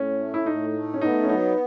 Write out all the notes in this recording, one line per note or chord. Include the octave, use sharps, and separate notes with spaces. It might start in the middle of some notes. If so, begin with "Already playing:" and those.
Already playing: A2 C#4
A3
E4
A2 D#4
A3
C#4
B3 D#4
C#4
F#3 D#4